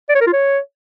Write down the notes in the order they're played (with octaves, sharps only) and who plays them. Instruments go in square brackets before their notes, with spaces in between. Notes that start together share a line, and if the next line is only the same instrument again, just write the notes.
[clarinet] D5
C#5
A#4
F4
C#5